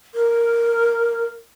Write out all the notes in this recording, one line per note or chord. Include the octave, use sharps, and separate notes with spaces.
A#4